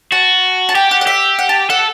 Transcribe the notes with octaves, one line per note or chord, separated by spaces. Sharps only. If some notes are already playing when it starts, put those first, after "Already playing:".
F#4 A5
A5
G4 G5
F#5
F#5
G4 E5
F#5
A5
A4 F#5